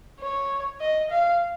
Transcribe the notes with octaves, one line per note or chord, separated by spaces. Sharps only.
C#5
D#5
F5